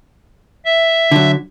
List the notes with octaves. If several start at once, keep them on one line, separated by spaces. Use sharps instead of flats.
E5
D3 F#3